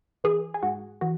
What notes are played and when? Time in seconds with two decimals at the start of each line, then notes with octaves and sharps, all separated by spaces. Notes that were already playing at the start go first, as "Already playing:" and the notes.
0.24 E3 G#4
0.54 G#4
0.63 G#2 F#4
1.01 E3 F#4